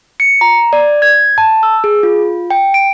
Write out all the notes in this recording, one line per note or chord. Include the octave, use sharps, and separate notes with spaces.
C#7
A#5
D5
G#6
A5
E6
G#4
F4
G5
D7